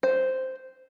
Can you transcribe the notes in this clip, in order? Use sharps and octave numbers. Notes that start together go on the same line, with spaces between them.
C5